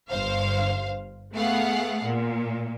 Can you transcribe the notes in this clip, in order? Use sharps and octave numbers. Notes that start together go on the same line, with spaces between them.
G1 G2 C5 F5
A3 B3 G#4 F5 F#5
A#2